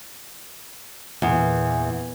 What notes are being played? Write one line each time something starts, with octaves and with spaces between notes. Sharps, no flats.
E2 A#2 E3